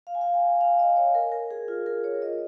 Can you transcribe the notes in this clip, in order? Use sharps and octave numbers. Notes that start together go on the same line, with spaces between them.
F5
G#5
F5
G#5
F5
D#5
C#5
A#4
A#4
G#4
F4
A#4
C#5
D#5